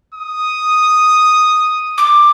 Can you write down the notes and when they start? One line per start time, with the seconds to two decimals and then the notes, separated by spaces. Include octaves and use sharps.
0.14 D#6
1.98 D6